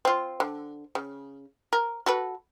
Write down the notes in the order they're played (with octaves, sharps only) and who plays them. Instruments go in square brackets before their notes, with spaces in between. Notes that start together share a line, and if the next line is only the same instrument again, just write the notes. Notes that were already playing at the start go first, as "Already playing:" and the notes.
[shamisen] C4 F4
D3
C#3
A#4
F#4 A4 B4